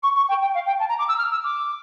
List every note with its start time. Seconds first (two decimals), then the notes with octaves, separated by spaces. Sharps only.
0.03 C#6
0.15 C#6
0.28 G5
0.41 G5
0.54 F5
0.66 G5
0.79 A5
0.89 A#5
0.99 D6
1.08 E6
1.18 F6
1.31 E6
1.44 D6